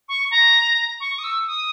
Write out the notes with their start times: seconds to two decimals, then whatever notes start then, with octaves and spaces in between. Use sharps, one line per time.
0.08 C#6
0.31 A#5
1.00 C#6
1.18 D#6
1.24 E6
1.46 D#6